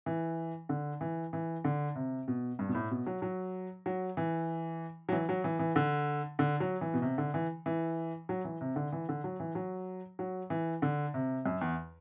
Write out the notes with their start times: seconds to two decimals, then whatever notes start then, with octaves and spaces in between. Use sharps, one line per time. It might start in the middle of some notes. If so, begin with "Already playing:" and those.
0.06 E3
0.69 D3
1.01 E3
1.33 E3
1.64 D3
1.95 C3
2.28 B2
2.59 G2
2.68 B2
2.75 A2
2.91 B2
3.06 F#3
3.22 F#3
3.86 F#3
4.17 E3
5.09 F#3
5.12 E3
5.29 F#3
5.44 E3
5.59 E3
5.76 D3
6.39 D3
6.60 F#3
6.81 E3
6.94 B2
7.02 C3
7.18 D3
7.34 E3
7.66 E3
8.29 F#3
8.45 E3
8.61 C3
8.76 D3
8.92 E3
9.09 D3
9.24 F#3
9.40 E3
9.55 F#3
10.19 F#3
10.50 E3
10.82 D3
11.14 C3
11.46 F#2
11.61 E2